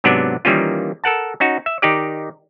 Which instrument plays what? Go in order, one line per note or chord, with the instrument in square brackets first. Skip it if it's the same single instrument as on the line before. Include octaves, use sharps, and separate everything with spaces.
[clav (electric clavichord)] G#2 C3 F#3 B3 D4 D5
D#3 E3 G3 A#3 C#4 F4
A4 A#4 F#5 A5
C#4 D#4 F#4
E5
D#3 D#4 G4 D5